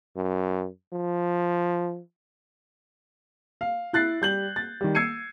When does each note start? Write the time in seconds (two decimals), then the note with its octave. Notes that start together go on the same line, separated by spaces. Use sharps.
0.17 F#2
0.93 F3
3.61 F5
3.93 E4 F#6 A6 C7
4.22 G3 G6 F#7
4.56 A6
4.81 D#3 G3
4.95 E6 G#6 C7 C#7 D#7